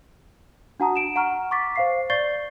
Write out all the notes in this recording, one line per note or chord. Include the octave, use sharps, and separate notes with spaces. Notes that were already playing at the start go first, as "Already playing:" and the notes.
D4 F#4 F#5 A5 A#5 D#6
D7 E7
F#5 A#5 C#6 F6
C#6 D6 A6 B6
C5 F5 C7
D5 C#6 G6 A6 C7 G7